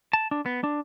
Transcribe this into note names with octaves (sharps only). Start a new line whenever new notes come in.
A5
D4
B3
D4